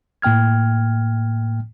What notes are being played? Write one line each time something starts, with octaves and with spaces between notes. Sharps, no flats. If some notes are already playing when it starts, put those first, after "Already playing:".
A2 A#3 G5 F6 G#6